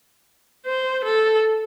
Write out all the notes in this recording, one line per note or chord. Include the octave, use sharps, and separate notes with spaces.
C5
A4